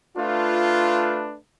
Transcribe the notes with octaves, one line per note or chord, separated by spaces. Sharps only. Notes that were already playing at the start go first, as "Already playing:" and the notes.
A3 D4 F4 B4